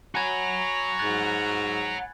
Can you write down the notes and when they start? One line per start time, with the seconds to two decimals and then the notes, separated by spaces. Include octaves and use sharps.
0.15 F#4 C#5 G#5 A#5 B5 G#6
0.99 G#2 F#6 G#6 A6